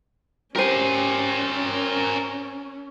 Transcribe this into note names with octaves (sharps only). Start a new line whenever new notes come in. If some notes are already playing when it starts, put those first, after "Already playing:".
C4 C#4 G4 A#4 C5 G#5